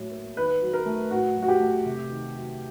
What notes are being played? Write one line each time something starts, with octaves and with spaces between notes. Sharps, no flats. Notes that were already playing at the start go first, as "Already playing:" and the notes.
Already playing: A2 F#3 C#5
A#3
D#3 B4
F#3
A#4
A3
A2 F#4
F#3
F#4
G4
A3
C3
D#3
F#3